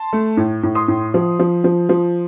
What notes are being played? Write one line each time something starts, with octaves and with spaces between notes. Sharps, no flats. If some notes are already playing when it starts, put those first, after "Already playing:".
Already playing: A5 C6
A3
A2
A2
C6 D#6
A2
F3
F3
F3
F3